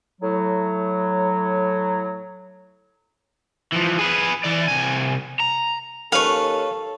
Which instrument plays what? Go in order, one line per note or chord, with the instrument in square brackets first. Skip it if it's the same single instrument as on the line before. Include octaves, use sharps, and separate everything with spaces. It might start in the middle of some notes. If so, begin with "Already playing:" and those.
[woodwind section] A2 F#3
[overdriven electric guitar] E3 F3
G#4 B4
E3 D5
C2 G#5
A#5
[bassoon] D#2 [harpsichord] C#4 B4 [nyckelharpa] A4 [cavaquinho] F5 C#6